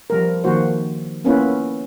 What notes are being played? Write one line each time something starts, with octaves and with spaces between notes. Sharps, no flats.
F3 G3 A#4
D#3 F3 A#3 F#4 C5
A#3 B3 C#4 E4 F4 B4